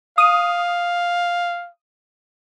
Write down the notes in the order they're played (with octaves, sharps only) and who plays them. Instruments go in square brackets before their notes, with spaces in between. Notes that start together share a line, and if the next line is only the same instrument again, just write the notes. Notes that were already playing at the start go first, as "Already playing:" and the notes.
[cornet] F5 [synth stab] D#6